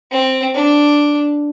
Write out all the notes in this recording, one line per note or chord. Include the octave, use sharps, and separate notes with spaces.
C4
D4